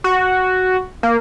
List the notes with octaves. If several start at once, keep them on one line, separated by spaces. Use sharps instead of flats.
F#4
A#3